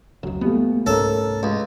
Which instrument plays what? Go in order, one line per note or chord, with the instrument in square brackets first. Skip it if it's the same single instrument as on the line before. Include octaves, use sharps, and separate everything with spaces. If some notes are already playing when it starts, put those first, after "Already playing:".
[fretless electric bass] F1 C#2 [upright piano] F#3
[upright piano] A#2 G3 A3 [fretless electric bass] B3
[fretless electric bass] C2 G#2 A3 [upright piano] C#4 A#4 [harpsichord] A4
[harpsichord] C#2